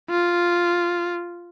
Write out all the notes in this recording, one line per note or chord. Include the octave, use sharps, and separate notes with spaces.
F4